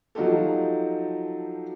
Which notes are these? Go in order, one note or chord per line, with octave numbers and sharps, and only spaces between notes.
F3 F#3 D#4 F4 G4 A4